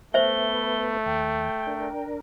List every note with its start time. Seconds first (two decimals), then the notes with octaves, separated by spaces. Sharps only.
0.14 A3 B3 B4 C5 E5 G7
1.06 D#2 G5
1.67 D4 A#4